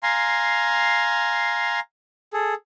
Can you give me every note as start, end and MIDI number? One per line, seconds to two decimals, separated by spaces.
0.03 1.80 77
0.03 1.80 80
0.03 1.80 82
0.03 1.80 84
2.33 2.54 68
2.33 2.54 69